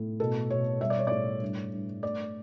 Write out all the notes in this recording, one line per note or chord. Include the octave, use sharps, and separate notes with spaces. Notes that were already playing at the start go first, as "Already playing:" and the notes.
Already playing: A2
B2 A4
B2 C#5
G3 E5
D5
C#5
A2 D5
G2
G2
A3 D5